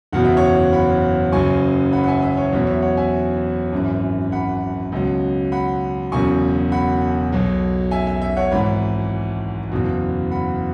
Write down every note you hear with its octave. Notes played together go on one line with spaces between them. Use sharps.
F#1 E2 B2 F#3 F#5
E5
C#5 F#5
F#5 B5
F#1 F#2 C#3 F#3 G#5 C#6
F#5 B5
F#5
E5 G#5
E5
C#5
E2 B2 F#3 E5
C#5
E5
C#5 F#5
E5 G#5
G#1 F#2 E3
F#5 B5
C#2 B2 F#3
F#5 B5
E1 E2 C#3 F#3 G#5 C#6
F#5 B5
B1 B2 F#3
E5 G#5
E5
E5
C#5 F#5
G#1 G#2 E3 F#5 B5
F#1 E2 B2
F#5 B5